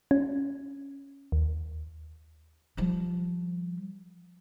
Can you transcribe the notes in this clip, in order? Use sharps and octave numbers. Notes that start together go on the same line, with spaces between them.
C#4
D#2
F3 G3